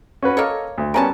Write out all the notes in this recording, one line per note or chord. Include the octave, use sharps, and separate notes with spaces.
C#4 F#4 B4
A#3 A4 C#5 D#5 F6
D2
G3 B3 C#4 A#4 G#5 A5